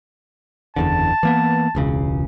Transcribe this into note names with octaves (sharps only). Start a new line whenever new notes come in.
F#1 E2 D3 A5
E3 A#3 B3
E1 C#2 C#3